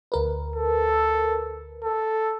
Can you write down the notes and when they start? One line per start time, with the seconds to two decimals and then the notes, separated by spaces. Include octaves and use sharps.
0.12 D2 A#4 B4
0.56 A4
1.84 A4